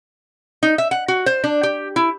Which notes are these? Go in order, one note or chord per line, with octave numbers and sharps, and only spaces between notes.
D#4
E5
F#5
F#4
C5
D4
G4
E4